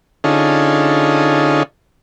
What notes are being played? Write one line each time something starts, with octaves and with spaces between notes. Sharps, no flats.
D3 C#4 D#4 F4 G#4 A4